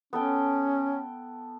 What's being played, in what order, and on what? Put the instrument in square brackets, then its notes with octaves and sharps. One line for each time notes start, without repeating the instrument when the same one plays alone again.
[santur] B3 A4 G5 [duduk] C#4